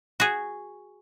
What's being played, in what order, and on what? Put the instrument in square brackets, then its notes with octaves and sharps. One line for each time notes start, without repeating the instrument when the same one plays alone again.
[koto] F#4 G#4